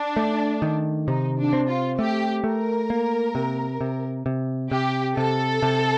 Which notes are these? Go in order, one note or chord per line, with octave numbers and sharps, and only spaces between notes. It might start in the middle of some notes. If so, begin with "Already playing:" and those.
Already playing: D4
A3
D#3
C3 D#4
D4
C4
F4
A3 G4
A3 A#4
A#3
C3
C3
C3
C3 G4
C3 A4
C3